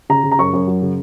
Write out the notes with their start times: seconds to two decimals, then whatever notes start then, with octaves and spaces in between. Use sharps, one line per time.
0.09 C#3 A#5
0.24 C#3
0.31 A#5
0.39 F#2 C#6
0.53 F#2
0.67 F#3
0.82 C#3